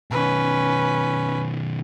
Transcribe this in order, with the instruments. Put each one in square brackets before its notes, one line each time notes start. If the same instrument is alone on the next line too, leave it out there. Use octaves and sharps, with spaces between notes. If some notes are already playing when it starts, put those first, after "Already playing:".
[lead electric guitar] B2 D#3 [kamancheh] C#4 B4